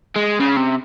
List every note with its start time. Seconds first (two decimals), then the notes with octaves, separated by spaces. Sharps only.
0.16 G#3
0.40 C#3
0.56 C3